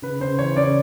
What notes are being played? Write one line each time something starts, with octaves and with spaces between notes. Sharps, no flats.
C#3 B4
C#3 C5
E3 C#5
C#3 D5